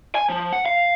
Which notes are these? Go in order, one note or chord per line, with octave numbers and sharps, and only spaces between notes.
G#5
F3
F#5
F5